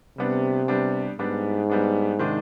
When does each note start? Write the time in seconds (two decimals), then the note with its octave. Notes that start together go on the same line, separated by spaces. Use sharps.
0.18 C3 G3 B3 D4
0.68 G3 B3 D4
1.19 G#2 G3 B3 D4
1.70 G3 B3 D4
2.19 C3 D#3 G#3 D4